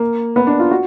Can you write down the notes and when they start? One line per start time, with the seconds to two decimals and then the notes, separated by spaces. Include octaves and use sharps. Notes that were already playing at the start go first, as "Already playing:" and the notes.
Already playing: A#3
0.36 B3
0.47 D4
0.59 F4
0.71 F#4